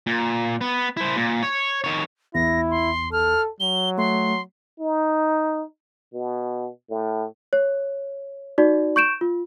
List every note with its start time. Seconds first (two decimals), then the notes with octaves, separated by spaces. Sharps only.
0.07 A#2
0.61 B3
0.97 E4 C5
1.17 A#2
1.43 C#5
1.84 D#3 C#5
2.35 A1 E2 E4 A#6
2.70 C6
3.13 A4 F6
3.60 F#3 G7
3.98 A3 C6
4.80 D#4
6.14 B2
6.90 A2
7.53 C#5
8.58 D#4 F#4 D5
8.96 C#6 G6 D7 E7
9.21 F4